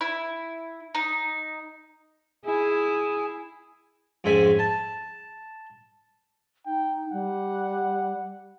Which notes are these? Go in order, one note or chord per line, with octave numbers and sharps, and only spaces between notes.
E4
D#4
E4 G#4
F2 G#2 C#4 E5 G#5
A5
D#4 G5
G3 F#5